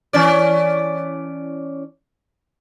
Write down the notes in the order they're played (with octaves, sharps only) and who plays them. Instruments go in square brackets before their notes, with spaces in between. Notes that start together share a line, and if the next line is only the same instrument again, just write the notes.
[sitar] E3 C#4 D5